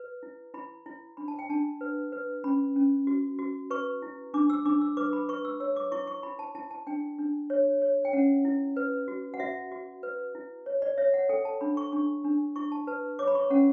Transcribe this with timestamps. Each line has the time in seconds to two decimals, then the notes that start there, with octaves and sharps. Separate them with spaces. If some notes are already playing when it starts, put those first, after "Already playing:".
Already playing: B4
0.23 E4
0.54 E4 B5
0.86 E4
1.17 D4 B5
1.28 A5
1.39 G5
1.49 D4 A5
1.81 B4
2.12 B4
2.44 C#4 B5
2.76 C#4
3.07 F#4
3.39 F#4
3.70 B4 C#6
4.02 E4
4.34 D4 D6
4.50 E6
4.66 D4 D6
4.81 E6
4.97 B4 D6
5.13 B5
5.29 B4 C#6
5.45 E6
5.60 C#5 E6
5.76 D6
5.92 E4 C#6
6.07 C#6
6.23 E4 B5
6.39 A5
6.55 E4 A5
6.71 A5
6.87 D4 G5
7.19 D4
7.50 C#5
7.82 C#5
8.05 G5
8.13 C#4 F#5
8.45 E4
8.77 B4
9.08 F#4
9.34 F#5
9.40 F#4 E5
9.71 F#4
10.03 B4
10.35 E4
10.66 C#5
10.82 D5
10.98 C#5 E5
11.14 F#5
11.29 A4 G5
11.45 A5
11.61 D4 B5
11.77 C#6
11.92 D4 C#6
12.24 D4
12.56 E4 C#6
12.72 A5
12.87 B4 A5
13.19 C#5 D6
13.27 B5
13.35 C#6
13.50 C#4 F#5